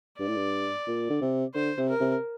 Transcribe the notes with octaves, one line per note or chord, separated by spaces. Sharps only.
G2 D5
A2
G2
A#2
D3
C3
D3 C5
C3
A#4
C3